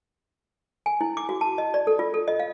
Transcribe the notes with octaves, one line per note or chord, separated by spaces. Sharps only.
G#5
E4
D6
F#4
A5
D#5
D5
A4
F4
A4
D#5
F5